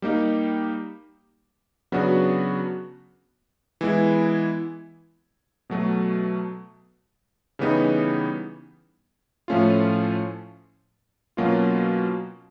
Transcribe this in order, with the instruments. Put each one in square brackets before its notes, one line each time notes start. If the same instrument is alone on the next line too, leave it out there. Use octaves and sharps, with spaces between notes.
[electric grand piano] G3 A#3 D#4 G4
C#3 F#3 B3 D4 F#4
E3 G#3 B3 E4
B2 F#3 A3
C#3 E3 G3 B3 D#4
A2 F3 A3 C#4 F4
B2 F#3 A#3 C#4 F4